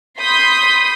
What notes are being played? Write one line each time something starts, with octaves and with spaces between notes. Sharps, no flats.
B5 C6 D#6 G6 B6